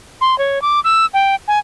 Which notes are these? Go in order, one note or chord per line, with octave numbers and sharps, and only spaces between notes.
C6
C#5
D6
E6
G5
G#5